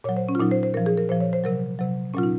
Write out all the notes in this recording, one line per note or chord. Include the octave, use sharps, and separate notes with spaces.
A#2 F#3 C#5
C5
C#4
F4
A#2 F#3 D#4
C5
C5
A#2 F3 A#4
G#4
A#4
A#2 F3 C5
C#5
C5
C3 F#3 A#4
C3 F#3
A#2 F#3 C#4 F4
D#4